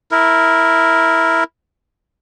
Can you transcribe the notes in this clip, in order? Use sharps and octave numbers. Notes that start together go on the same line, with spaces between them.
E4 A#4